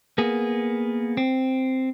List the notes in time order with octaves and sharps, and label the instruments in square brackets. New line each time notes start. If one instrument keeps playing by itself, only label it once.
[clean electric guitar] A#3 B3 G#4
C4